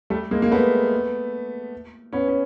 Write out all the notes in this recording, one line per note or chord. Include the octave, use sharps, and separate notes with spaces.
G3 A3
G#3 A#3
A#3
A3 B3
B3 C#4
C#4